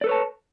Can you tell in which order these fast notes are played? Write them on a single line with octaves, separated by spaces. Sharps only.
D5 A4 B4 C#5 A5